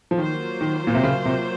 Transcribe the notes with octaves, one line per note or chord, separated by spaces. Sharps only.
F3
D#3 F#3 A#3 F4 C5
D#3
A#2
C3
C#3
C3